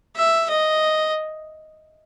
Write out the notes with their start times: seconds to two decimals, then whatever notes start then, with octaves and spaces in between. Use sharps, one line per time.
0.16 E5
0.50 D#5